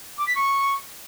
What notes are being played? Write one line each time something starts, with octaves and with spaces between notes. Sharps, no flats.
D6
B6
C#6